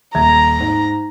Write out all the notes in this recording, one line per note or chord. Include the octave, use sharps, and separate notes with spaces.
D#1 E5 A#5 G#6
G#2